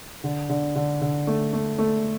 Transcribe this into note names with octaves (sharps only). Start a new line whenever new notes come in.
D3
D3
D3
D3
A3
A3
A3